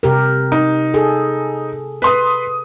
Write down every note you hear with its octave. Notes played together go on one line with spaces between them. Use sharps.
C3 G4 A#4
D#4
G#4 A4
B4 C6 D#6